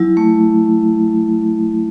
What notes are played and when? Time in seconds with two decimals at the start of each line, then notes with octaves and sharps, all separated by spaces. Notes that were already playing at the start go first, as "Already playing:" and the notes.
Already playing: F#3 E4
0.17 A3